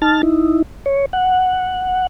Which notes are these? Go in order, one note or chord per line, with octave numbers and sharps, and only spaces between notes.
D#4 A5 F6 A6
D#4 E4
C#5
F#5